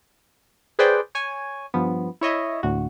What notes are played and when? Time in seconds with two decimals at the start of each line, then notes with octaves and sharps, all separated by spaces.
0.79 G#4 B4 C5 D5 G5
1.15 C#5 G#5
1.74 G2 F3 B3
2.21 E4 C#5 D#5 E5
2.63 D2 A2 F#4